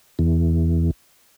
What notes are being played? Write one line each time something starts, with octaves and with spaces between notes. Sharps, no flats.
E2